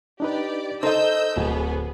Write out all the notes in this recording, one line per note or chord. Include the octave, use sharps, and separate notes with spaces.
D4 D#4 G4 B4 D5
D#4 A4 A#4 C5 D#5 E6 G6
D1 B3 G#4